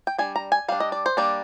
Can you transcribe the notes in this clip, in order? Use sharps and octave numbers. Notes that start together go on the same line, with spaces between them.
G5
G3 D4 G#5
A#5
G#5
G3 D4 F5
D#5
D5
C5
G3 A#3 D4 D5